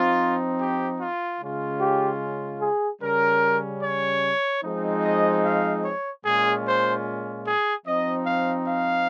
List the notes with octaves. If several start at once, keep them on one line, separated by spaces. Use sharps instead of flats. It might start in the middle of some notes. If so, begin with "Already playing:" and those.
Already playing: F3 C4 D#4 F4
G4
F4
C#3 G#3 C#4 F4
G4
G#4
C#3 G3 C#4 A#4
C#5
F3 G#3 C4 D#4
D#5
F5
C#5
A#2 G#3 C#4 F4 G#4
C5
G#4
F3 C4 D#4 D#5
F5
F5